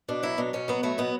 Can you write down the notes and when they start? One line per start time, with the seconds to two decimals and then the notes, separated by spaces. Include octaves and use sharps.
0.08 B2 D4
0.23 F#3 E4
0.38 B2 D4
0.53 B2 C#4
0.68 F#3 B3
0.83 F#3 A3
0.98 B2 B3